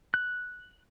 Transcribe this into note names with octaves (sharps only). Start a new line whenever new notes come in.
F#6